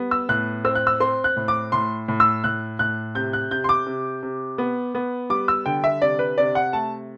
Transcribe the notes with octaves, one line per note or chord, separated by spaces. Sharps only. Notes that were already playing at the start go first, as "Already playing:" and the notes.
Already playing: G3 B3
E6
A2 F#6
C4 E6
F#6
E6
C4 C6
F#6
A2
D6
A2 C6
A2
E6
A2 F#6
A2 F#6
C3 G6
F#6
C3 G6
C6
D6
C3
C3
B3
B3
G3 D6
E6
D3 G5
E5
C3 D5
B4
C3 D5
F#5
A3 A5